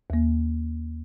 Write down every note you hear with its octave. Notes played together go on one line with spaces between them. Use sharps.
D#2 A#3